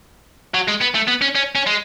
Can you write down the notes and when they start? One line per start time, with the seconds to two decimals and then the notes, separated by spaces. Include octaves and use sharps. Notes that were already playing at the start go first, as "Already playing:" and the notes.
0.54 F#3
0.68 G#3
0.81 B3
0.95 A3
1.08 B3
1.22 C#4
1.35 C#4
1.55 C#4
1.67 G#3